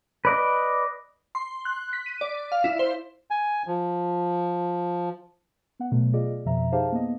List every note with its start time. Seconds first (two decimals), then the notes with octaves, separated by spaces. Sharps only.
0.25 B4 D5 D#5
1.35 C6
1.65 F#6
1.93 B6
2.06 D#7
2.21 D5
2.52 F5
2.64 E4
2.79 C5
3.31 G#5
3.67 F3
5.80 B3 F#5
5.91 B2 F#3 A3
6.13 F4 G#4 D5 D#5
6.45 F2 B2 F3 E5 A#5
6.72 D#4 G4 G#4 C5 F5 A5
6.92 A#3 B3 D#5